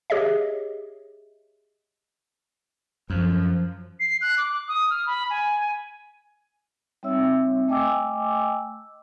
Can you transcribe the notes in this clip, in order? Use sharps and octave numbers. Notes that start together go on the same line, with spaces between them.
G4 G#4 C#5 D#5 E5
F#2 F3
C7
F#6
D6
D#6
F6
B5
G#5
G3 C4 D#4 C#5 E5 E6
A3 D#5 G5 G#5 D6 E6